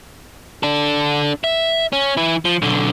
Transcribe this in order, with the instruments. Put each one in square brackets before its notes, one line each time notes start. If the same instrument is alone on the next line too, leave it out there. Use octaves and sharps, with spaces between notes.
[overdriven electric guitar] D4 A4
E5
C#4
E3 E4
F3
B1 D3